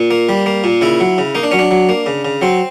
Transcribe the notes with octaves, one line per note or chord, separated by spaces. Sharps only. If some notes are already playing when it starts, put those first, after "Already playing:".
Already playing: A#2
A#3
G3
A#3
A#2
C#3 E4
F#3
C#3
A#3 D#4
D4
F#3 C#4
D4
F#3
A#3
C#3
C#3
F#3 C4